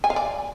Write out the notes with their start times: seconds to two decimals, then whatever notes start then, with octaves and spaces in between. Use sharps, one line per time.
0.04 G#5
0.10 F5
0.16 D5